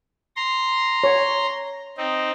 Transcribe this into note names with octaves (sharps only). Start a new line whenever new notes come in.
A#5 C6
C#5
C4 D#4